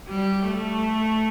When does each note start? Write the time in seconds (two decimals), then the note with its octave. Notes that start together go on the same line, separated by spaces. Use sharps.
0.09 G3
0.47 A3